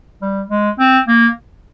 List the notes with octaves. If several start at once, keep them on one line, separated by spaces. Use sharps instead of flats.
G3
G#3
C4
A#3